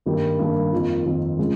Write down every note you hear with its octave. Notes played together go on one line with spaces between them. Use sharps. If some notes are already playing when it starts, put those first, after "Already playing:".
G2 D#3 G3 A#3
G2 D#3 G3 A#3
F2 D#3 A#3 F4
F2 D#3 A#3 F4
C#3 F3 G#3